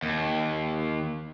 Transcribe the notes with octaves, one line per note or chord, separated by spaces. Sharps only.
D#2